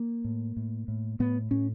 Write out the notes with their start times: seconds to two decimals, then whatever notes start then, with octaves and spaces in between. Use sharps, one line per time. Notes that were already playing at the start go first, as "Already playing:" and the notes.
Already playing: A#3
0.24 A2
0.57 A2
0.88 A2
1.20 A2 B3
1.51 A2 C#4